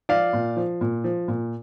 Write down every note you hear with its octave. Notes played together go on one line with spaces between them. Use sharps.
F3 D5 F5
A#2
F3
A#2
F3
A#2